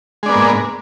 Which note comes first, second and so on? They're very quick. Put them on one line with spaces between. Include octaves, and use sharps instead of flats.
G#3 D4 B3 A#3 G#2